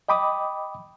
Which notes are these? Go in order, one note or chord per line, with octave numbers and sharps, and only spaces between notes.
D#5 G5 B5 D6 D#6